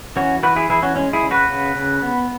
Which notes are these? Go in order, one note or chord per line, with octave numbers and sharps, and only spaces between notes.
E3 C#4 F#4
E3 F#4 B4
E4 G#4
E3 E4 G#4
C#4 F#4
G#3 C#4
E4 G#4
C#3
F#4 B4
C#3
C#3
B3